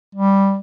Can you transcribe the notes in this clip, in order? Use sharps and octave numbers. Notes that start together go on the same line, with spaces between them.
G3